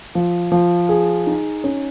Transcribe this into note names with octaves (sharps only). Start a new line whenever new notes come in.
F3
F3
G#4
D#4
C#4